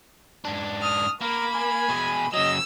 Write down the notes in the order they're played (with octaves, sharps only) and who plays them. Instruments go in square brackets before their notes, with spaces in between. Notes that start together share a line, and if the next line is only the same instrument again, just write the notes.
[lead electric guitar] G#2 D4
[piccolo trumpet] D#6 [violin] F6
[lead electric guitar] A#3 [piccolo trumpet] A#4 [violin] B5
[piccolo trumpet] G#5
[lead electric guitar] B2 G#4
[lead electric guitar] C#3 F#3 [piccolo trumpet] D#5 [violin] E6